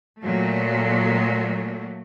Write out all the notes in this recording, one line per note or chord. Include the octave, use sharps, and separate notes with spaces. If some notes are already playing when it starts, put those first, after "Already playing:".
A#2 F#3 A3